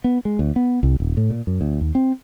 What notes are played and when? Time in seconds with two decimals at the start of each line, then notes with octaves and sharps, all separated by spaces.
0.04 B3
0.25 G#3
0.39 D2
0.56 B3
0.83 C2
1.00 D#1
1.17 A2
1.30 A#2
1.47 F#2
1.61 D2
1.81 D#2
1.95 C4